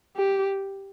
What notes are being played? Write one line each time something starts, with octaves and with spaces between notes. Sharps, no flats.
G4